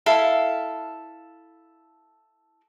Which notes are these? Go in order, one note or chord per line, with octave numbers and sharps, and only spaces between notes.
E4 A4 F5